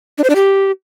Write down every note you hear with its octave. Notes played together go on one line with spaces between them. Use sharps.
D4
C5
D4
G4